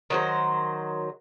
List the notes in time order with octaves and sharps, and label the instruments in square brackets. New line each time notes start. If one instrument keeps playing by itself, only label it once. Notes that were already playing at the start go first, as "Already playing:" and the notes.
[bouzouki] D#3 F#3 C5